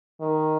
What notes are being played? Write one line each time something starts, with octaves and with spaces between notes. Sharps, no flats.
D#3